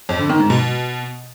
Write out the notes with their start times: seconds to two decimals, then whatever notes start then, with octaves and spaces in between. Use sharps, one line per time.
0.09 F2
0.19 D3
0.29 D#3
0.40 G#2
0.50 B2